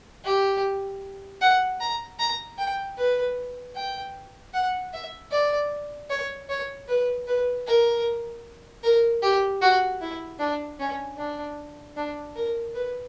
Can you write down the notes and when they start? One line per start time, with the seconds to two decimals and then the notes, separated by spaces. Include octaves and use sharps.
0.24 G4
1.42 F#5
1.80 A#5
2.19 A#5
2.58 G5
2.97 B4
3.76 G5
4.54 F#5
4.93 E5
5.32 D5
6.10 C#5
6.49 C#5
6.88 B4
7.27 B4
7.67 A#4
8.83 A#4
9.23 G4
9.62 F#4
10.01 E4
10.39 D4
10.79 C#4
11.18 D4
11.96 D4
12.36 A#4
12.74 B4